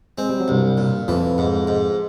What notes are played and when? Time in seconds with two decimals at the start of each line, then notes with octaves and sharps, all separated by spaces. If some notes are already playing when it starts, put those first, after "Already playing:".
0.18 G#3 C4
0.29 G3
0.40 F#3
0.48 C2 G2 G3
0.77 A#2
1.08 F2 E3 F3
1.38 G#2
1.67 G#2